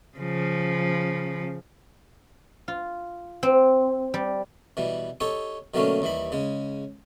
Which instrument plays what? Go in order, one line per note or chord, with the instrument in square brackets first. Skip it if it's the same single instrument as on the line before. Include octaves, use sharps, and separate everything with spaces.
[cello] C#3 F3
[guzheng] F4
C4
G3
[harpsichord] B2 E3 G3
D#4 G4 A4 C#5
B2 D3 F#3 A3 A#3 C#4
D#2 E3 G3 B5
C#3 G#3